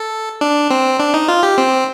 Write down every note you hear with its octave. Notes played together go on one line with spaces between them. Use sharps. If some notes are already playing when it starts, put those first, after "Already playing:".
Already playing: A4
D4
C4
D4
D#4
F4
G4
C4